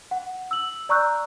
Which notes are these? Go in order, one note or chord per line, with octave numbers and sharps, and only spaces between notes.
F#5
E6 F#7
D5 A#5 C#6 E6 F#6 G6